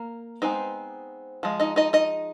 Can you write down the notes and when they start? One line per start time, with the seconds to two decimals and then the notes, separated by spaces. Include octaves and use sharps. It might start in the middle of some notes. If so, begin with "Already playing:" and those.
Already playing: A#3 A#4
0.42 G#3 B3 C4 D#4 C5
1.43 F3 G#3
1.60 D#4 D#5
1.76 D#4 D#5
1.93 D#4 D#5